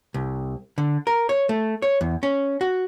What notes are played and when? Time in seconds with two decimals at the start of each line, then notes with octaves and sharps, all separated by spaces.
0.14 C2
0.78 D3
1.07 A#4
1.29 C#5
1.49 A3
1.82 C#5
2.01 E2
2.23 C#4
2.61 F#4